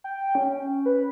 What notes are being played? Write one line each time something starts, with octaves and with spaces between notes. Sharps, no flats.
G5
C#4
B4